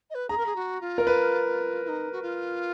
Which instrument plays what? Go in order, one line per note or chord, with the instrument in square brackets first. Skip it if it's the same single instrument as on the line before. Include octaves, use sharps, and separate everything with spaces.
[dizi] D#5
B4
[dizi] G#4 [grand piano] A#5
[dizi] A#4
G#4
F#4
F4
[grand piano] A#4
B4
[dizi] F4
D#4
F#4
F4